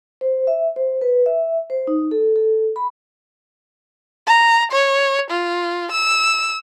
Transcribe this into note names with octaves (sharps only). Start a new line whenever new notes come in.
C5
E5
C5
B4
E5
C5
D#4
A4
A4
B5
A#5
C#5
F4
E6